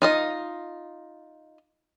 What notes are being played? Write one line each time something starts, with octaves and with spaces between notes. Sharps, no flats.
D#4 F4 D#5